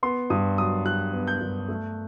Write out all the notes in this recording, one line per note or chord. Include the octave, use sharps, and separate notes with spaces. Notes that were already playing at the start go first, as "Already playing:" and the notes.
B3 C6
G2 D#6
F#3 D#6
G2 F#6
B3
G6
G2
A3